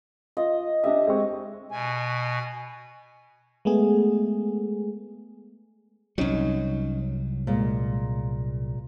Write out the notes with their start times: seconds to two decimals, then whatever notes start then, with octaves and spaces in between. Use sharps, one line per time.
0.37 F4 D#5
0.84 D4 G4 D#5 E5
1.07 G#3 C4 C#6
1.72 B2 G#5
3.65 G#3 A3 B3 G#4
6.18 C2 F#3 C#4 D#4
7.47 A#2 G#3